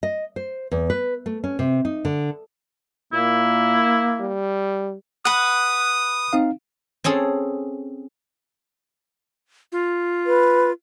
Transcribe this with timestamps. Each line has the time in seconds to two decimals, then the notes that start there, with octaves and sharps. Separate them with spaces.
0.03 D#5
0.36 C5
0.71 E2
0.90 B4
1.26 A3
1.44 C#4
1.59 C3
1.85 D#4
2.05 D3
3.13 A#2 A#3 E4
4.20 G3
5.25 B4 F#5 B5 D#6 F#6
6.33 C4 D#4 F5
7.04 C4 C#4 G#4 A4
9.72 F4
10.26 B4